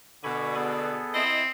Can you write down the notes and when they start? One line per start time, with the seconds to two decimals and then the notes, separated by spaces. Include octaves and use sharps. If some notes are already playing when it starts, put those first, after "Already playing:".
0.24 B2 D3 G#5 B5 C#6
0.56 B3 G#4 A4
1.15 C4 E4 D#5